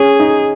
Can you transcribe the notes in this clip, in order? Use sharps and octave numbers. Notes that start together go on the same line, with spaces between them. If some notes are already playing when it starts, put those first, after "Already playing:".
Already playing: C#4 G#4
D#4